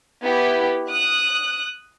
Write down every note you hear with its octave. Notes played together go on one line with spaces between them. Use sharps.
B3 E4 G4
D#6 F#6